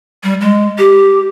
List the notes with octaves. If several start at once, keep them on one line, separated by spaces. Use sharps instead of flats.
G3
G#3
G4